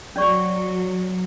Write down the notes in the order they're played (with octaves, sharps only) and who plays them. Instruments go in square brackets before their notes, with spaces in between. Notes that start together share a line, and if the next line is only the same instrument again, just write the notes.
[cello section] F#3 [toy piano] C#4 D5 C#6